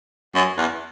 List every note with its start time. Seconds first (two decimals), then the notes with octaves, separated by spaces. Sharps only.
0.35 F#2
0.58 E2